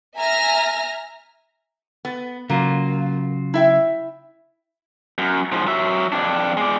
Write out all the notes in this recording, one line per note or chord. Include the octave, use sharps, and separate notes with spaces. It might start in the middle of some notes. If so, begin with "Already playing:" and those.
E5 G#5 A#5 F6 A#6
B3
C#3 F#3 A#3 F4
E4 E5 G5
F#2
G#2 F3
F#3 E5
F2 D4
G#3 D5